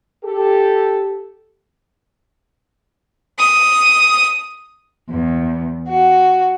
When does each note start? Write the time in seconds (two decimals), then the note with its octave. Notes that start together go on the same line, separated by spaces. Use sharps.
0.24 G4 A4
3.39 D#6
5.10 E2
5.89 F#4